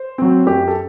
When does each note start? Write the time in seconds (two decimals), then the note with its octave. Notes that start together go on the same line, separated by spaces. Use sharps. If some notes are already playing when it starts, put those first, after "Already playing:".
Already playing: C5
0.18 F#3 C4
0.47 F#2 G4
0.68 A4